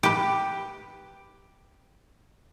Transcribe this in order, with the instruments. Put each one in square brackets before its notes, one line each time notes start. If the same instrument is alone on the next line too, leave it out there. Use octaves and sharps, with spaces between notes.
[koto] G4 B4